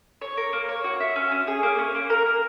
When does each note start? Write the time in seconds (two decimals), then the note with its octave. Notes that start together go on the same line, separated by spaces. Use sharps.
0.21 C#5
0.37 A#4
0.53 A#3
0.69 C#5
0.84 F#4
1.00 E5
1.16 C#4
1.32 C#4
1.47 G#4
1.63 A#3
1.78 C#4
1.95 A#3
2.10 A#4
2.26 A#4